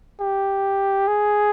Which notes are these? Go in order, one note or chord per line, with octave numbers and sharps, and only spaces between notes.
G4
G#4